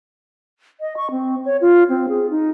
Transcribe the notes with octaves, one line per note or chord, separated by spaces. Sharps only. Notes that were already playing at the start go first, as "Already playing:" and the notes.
D#5
C#6
C4
C#5
F4
C4
G#4
D#4